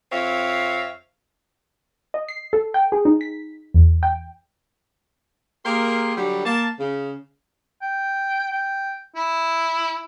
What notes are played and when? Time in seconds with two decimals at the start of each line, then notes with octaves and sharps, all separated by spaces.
0.11 F2 C4 C#5 E5 F5
2.14 D#5
2.29 C7
2.53 A4
2.74 G5
2.92 G#4
3.05 D#4
3.21 B6
3.74 E2
4.03 G5
5.65 A#3 G4 G#4 A#4 C6
6.16 D3 F#3 G3
6.45 A#3 A5
6.79 C#3
7.82 G5
8.51 G5
9.16 E4